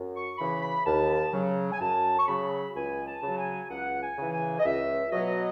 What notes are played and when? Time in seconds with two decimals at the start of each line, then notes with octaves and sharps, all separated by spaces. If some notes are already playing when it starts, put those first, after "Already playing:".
Already playing: F#2
0.16 C#6
0.38 C#3 E3 B5
0.63 B5
0.86 D#2 A5
1.33 C#3 F#3
1.72 G#5
1.80 F#2 A5
2.19 C#6
2.28 C#3 F#3 B5
2.75 C#2 G#5
3.07 A5
3.22 C#3 F#3
3.38 G#5
3.70 C#2 F#5
4.02 G#5
4.18 C#3 E3
4.33 G#5
4.60 D#5
4.65 C#2 E5
5.12 B2 F#3 D#5